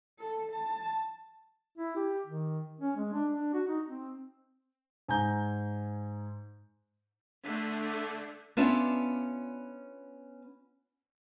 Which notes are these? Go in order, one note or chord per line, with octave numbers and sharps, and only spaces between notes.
A4
A5
E4
G4
D#3
C#4
G#3
D4
D4
F#4
D#4
C4
G#2 G#5 A#5 G6
D3 A3
B3 C#4 D4 F4 D5 E5